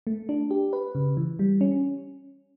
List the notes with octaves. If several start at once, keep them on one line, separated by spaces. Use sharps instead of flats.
A3
D4
G4
B4
C#3
E3
G3
C#4